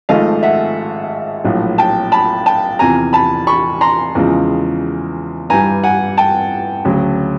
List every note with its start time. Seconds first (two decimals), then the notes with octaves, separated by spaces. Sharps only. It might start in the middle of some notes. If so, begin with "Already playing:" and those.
0.09 G#1 G#2 F3 A3 D#5 F5
0.43 E5 F#5
1.44 A#1 A2 F#3
1.78 G5 A5
2.12 A5 B5
2.46 G5 A5
2.79 E2 C3 F3 G#5 A#5
3.13 A5 B5
3.47 B5 C#6
3.81 A#5 C6
4.15 E2 C#3 F3 G#3
5.50 G2 E3 G3 G#5 A#5
5.84 F#5 G#5
6.18 G5 A5
6.85 D2 C#3 F#3